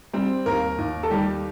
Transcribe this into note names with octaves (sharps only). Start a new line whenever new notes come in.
G3 C4 C5
D#2 A#3 A#4
D#2
A4
D#3 G3 G4